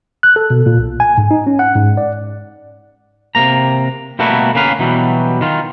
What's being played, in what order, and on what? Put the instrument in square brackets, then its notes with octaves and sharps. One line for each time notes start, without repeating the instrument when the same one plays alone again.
[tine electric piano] F#6
A4
B2
A#2
B1
G#5
G#2
D#4
C#4
F#5
G#2
D5
[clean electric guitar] C3 A#3 A#5
B2 G3 A3 A#3 E4 F#4
A#3 C#4 B4 F5
B2 E3 F#3 G3
D#3 F4